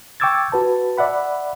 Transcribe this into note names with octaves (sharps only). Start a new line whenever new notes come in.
G5 C#6 D6 E6 G#6 A6
F#4 B4 A5
D5 E5 F#5 B5